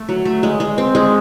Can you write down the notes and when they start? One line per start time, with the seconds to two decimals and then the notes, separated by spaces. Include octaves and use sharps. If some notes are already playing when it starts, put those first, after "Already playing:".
Already playing: A3
0.09 F#3
0.25 A3
0.43 G#3
0.60 G#3
0.78 C4
0.95 G#3